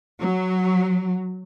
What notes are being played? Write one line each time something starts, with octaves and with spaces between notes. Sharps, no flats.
F#3